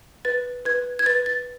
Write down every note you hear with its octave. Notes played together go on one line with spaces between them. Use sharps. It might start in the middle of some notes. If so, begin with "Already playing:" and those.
B4 A6
B4 G#6
G#6
B4 A6
A6